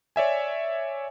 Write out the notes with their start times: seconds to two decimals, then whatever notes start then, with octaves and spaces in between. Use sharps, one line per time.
0.16 C#5 D5 E5 G#5